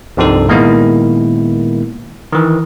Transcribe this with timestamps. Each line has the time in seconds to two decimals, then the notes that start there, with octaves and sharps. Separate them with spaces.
0.17 C2 G2 C3 F3 D#4 A4
0.49 A#2 D#3 G#3 A#3 B3 E4
2.33 D#3 E3